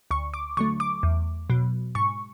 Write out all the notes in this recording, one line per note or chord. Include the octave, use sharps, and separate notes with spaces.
D2 C#6
D6
D3 F#3 A3 C#6
D6
E2
B2 F#3
G#2 C#6